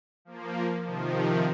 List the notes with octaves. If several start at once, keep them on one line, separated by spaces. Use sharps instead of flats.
F3 A#3
C3 D#3 F3